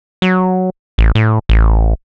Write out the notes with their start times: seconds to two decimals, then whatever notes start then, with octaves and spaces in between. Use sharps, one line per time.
0.22 F#3
0.98 A1
1.15 A2
1.49 A1